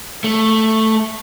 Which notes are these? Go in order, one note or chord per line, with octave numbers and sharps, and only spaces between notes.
A3